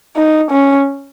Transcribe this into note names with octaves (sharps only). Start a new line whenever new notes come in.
D#4
C#4